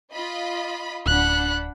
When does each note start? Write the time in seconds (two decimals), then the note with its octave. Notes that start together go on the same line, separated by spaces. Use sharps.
0.12 F4 D#5 B5
1.06 D1 D4 F#5 B5 F#6